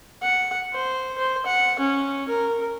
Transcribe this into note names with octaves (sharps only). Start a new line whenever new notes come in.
F#5
C5
C5
F#5
C#4
A#4